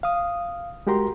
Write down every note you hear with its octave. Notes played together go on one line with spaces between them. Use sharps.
F5 D#6
G#3 F#4 G4 A#4 A#5 C6